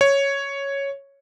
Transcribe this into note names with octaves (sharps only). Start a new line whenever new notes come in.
C#5